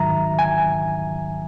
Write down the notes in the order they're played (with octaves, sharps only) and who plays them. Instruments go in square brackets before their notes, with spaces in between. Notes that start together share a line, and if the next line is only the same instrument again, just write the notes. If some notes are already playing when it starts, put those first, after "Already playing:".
Already playing: [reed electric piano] G#2 D#3 F#3 E5 A#5
G#5